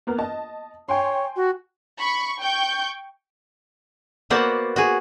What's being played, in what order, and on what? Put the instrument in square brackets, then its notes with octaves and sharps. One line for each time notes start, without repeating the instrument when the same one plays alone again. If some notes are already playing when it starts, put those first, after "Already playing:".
[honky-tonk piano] A#3 B3 A#4
D#5 A5
[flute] C#5 [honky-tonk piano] G5 G#5 C6
[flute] F#4
[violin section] B5 C#6
G5 C#6 G6
[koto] A#3 B3 F#4 C5 D5 F#5
F#4 G#4